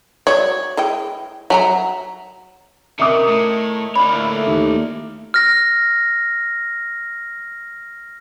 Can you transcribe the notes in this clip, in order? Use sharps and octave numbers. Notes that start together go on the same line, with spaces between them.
F#3 C#5 D5
E3 G#3 G5
F#3 E5 A5 A#5
C3 D#3 E5 D#6
A2
A#3 D4 F4 C#5 B5
A2 A3
D#2
F6 A#6